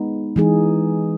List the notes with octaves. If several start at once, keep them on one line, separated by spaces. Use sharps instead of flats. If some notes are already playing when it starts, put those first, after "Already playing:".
Already playing: G#3 B3 D#4
E3 G#3 D#4 G#4